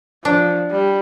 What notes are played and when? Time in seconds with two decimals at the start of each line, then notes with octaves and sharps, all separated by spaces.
0.25 F3 D4
0.71 G3